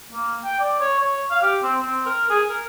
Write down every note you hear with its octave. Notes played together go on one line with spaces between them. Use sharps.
A#3
G5
D5
C#5
C#5
F5
G4
C4
C4
A#4
G#4
A#4